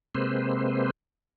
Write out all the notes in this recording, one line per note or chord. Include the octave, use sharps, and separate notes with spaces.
C3 G#3 A#3 C4 B4 C5